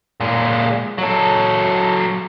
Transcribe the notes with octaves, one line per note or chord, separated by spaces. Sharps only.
A#2 G#3
F#3 A4